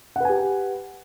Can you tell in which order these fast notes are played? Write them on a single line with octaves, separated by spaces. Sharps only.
F#5 B4 G#5 G4